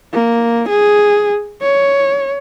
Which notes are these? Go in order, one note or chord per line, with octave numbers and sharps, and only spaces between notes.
A#3
G#4
C#5